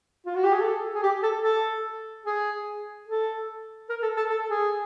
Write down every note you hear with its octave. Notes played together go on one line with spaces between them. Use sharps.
F4
F#4
G4
G#4
A4
G#4
G4
A4
A4
G#4
A4
A#4
A4
A4
A4
G#4